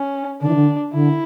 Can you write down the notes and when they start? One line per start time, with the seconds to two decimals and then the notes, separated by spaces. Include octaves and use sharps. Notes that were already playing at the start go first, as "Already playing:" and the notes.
Already playing: C#4
0.41 D3 D4
0.48 E3
0.55 D3
0.93 D3 E4